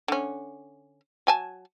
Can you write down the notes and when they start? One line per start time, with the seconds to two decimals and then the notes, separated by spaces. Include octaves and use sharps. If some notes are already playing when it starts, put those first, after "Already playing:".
0.08 D3 C#4
1.27 F#3 G#5 A5